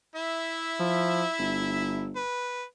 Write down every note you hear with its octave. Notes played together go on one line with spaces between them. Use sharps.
E4 E5
F3
G1
B4